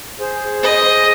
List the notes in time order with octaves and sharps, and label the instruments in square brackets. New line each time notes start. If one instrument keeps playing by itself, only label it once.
[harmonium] G#4 C5
[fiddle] D#5